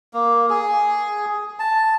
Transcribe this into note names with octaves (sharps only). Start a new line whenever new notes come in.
A#3
G#4
A5